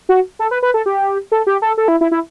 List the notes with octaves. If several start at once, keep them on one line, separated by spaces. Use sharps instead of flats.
F#4
A4
B4
B4
A4
G4
A4
G4
A4
A4
E4
E4
E4